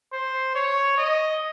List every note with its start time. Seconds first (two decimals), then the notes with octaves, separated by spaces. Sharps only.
0.13 C5
0.55 C#5
0.98 D#5